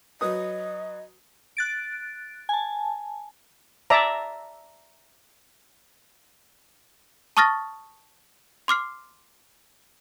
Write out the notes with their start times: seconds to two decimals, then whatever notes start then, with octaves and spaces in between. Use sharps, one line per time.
0.21 F#3 B4 D#5 D#6
1.57 F#6 A6 D7
2.49 G#5 A5
3.90 D5 E5 A5 A#5
7.37 A5 C#6 D#6 F6 A6 A#6
8.68 C6 D6 F6 C7